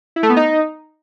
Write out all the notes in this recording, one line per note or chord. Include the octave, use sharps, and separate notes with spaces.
E4
A3
B3
D#4